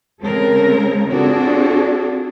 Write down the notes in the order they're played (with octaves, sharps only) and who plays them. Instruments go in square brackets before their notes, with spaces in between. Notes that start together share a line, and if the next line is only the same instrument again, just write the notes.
[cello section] C#3 G#3 C4 A4 A#4
C4 D4 F4 F#4 G#4 A4